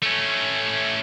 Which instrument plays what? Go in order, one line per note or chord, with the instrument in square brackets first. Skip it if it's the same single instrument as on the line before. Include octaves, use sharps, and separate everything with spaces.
[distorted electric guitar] A3 C#4